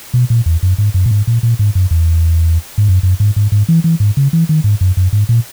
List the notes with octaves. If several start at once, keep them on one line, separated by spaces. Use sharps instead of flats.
B2
A#2
E2
F#2
G#2
F#2
A#2
G#2
A#2
A#2
G#2
F#2
E2
G#2
F#2
F#2
G#2
G#2
G#2
E3
E3
G#2
C#3
E3
D#3
G#2
F#2
F#2
G#2
A#2